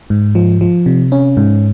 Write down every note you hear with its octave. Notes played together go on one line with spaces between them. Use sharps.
G#2
F3
F3
C3
C#4
G#2